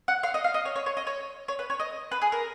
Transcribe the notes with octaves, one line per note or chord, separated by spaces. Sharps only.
F#5
F5
D#5
F5
D#5
C#5
C#5
C#5
D#5
C#5
C#5
B4
C#5
D#5
B4
G#4
A#4